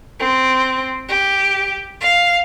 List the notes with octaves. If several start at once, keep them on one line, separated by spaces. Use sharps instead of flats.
C4
G4
F5